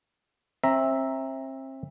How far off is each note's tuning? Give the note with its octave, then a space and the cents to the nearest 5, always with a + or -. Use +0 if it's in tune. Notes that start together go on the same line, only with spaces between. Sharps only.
C4 +35 E5 -5 A#5 +0